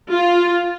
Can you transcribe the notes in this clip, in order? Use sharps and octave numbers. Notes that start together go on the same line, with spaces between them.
F4